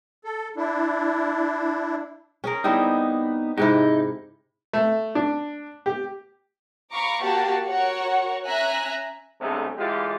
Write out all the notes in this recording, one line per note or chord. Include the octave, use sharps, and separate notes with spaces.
A4
D4 E4
C#4 G#4 A#4
G3 B3 C4 D#4 E4
G#2 C3 D#4 E4
A3
D4
G4
F5 A#5 B5 C#6 D6
A#3 F#4 G4 F5 F#5 A5
F#4 A#4 C#5 F#5 C#6
C#4 E5 G#5 A#5 F#6
B1 G#2 C3 A3 D4 G#4
A1 E3 G#3 F4 G4